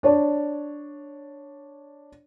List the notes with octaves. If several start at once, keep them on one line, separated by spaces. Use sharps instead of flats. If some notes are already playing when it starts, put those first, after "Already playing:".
D4 C#5 D5